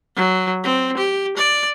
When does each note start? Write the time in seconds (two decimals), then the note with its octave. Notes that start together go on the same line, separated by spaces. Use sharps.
0.16 F#3
0.63 C4
0.97 G4
1.37 D5